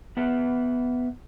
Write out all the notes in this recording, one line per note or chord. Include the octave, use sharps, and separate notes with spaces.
B3 B4 E5